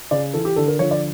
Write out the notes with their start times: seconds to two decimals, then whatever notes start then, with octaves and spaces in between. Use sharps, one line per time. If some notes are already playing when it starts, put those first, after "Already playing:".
0.11 C#3 D5
0.34 E3 A4
0.45 G4
0.56 D3 A4
0.68 A#4
0.79 F3 C#5
0.91 D5